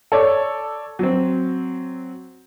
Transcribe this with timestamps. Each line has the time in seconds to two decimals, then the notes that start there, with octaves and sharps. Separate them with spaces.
0.12 A4 C#5 D5
0.99 F#3 C4